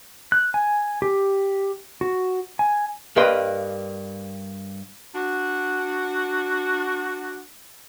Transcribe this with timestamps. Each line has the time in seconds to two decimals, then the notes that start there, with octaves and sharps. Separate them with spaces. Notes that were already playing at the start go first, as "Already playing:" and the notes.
0.32 F#6
0.54 G#5
1.02 G4
2.01 F#4
2.59 G#5
3.16 G2 A#3 B4 D#5 G5 C6
5.15 D4 F#4